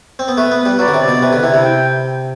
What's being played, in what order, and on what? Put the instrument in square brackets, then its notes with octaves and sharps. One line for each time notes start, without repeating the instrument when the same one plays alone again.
[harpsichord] C4
B3
[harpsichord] A3 [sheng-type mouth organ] B4
[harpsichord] B3
[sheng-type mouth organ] B4
[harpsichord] G3
[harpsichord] F#3 [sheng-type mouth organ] D5
[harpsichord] D3
C3
[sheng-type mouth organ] D5
[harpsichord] B2
[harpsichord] C3 [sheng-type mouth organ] B4
[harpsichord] D3
[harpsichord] C3 [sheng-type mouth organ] E4
[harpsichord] C3
[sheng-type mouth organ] G5